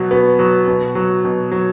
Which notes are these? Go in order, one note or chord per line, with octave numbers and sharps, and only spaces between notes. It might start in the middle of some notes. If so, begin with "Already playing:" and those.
Already playing: B2 F#3 F#4
B2 B3
F#3
B2
F#3
B2
F#3